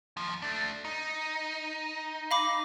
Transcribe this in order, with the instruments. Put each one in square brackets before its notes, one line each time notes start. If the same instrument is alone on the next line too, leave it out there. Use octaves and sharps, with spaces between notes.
[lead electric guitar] D#2 F3
A3 D4
D#4
[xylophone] F5 B5 D6